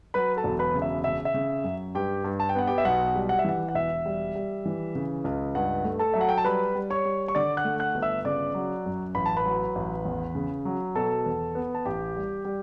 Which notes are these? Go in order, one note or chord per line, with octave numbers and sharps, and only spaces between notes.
F#3 B4 B5
A4 A5
E1
B4 B5
C#3
E5
C#3 E5
E5
C#3
F#2
G2 G4 G5
G2
A5
G5
B3 F#5
G4 G5
E5
B1 F#5
G3
F#5
E5
E3 F#5
F#5
E1 E5
G3
G3
E3
C#3
C#2
G2 F#5
A3
A4 A5
F#3 E5
F#5
G5
A5
G3 B4 B5
G3
C#5 C#6
G3
C#6
D3 D5 D6
F#5 F#6
A3
F#5 F#6
G1
E5 E6
C#3 D5 D6
F#3
F#2
A1 B5
A5
B4 B5
F#3
A1
E2
C#3
F#3
B2 A4 A5
E2
B3
A5
A1 G4 G5
G3
G3